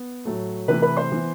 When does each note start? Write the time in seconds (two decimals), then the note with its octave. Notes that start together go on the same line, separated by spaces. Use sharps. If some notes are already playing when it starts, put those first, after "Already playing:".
Already playing: B3
0.25 A2 F#3 A3
0.68 C3 E3 A3 B4 B5
0.82 B4 B5
0.97 C5 C6
1.12 E3 B3